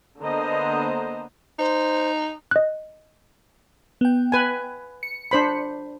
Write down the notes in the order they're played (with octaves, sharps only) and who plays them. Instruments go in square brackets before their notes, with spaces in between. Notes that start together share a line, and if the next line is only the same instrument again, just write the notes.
[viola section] D3 A#3 B3 C5 D#5 A#5
[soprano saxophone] D#4 [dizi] C5
[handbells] D#5 F#6
[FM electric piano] B3 G5
[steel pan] B4 G#5
[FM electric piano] C#7
[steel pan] D4 C5 B5